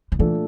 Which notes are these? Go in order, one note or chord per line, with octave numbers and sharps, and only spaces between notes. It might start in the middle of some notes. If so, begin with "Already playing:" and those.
D3
A#2 E3 A3 D4 A4